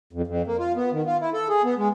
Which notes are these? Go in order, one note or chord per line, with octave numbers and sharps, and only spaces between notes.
F2
F2
A#3
F4
B3
D#3
F4
E4
A4
G#4
B3
G#3